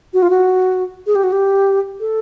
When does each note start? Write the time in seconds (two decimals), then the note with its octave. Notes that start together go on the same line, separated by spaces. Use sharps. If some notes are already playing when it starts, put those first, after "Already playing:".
0.14 F#4
0.22 F4
0.30 F#4
1.07 G#4
1.15 G4
1.24 F#4
1.32 G4
2.00 A4